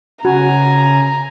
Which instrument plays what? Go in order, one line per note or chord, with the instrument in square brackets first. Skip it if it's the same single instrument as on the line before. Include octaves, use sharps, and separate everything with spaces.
[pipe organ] C#3 G#5 [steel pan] F#4 [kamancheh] A#5